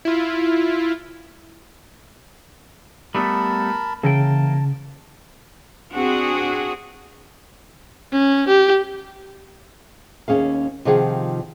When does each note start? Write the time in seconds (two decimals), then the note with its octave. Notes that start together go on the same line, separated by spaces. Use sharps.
0.05 E4 F4
3.15 G3 A3 B3 A#4 A5 B5
4.03 C#3 E3 A#3 G5 A5
5.93 C4 D4 F#4 G#4
8.12 C#4
8.48 G4
10.28 D#2 C#3 C#4 G#4 F5
10.85 C3 D#3 F3 F4 G#4 F#5